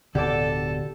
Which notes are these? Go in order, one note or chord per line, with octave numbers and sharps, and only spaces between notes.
D1 B2 D3 G4 A4 D5 A5